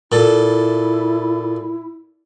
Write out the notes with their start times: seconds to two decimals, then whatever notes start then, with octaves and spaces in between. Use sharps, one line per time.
0.12 A#2 E4 A4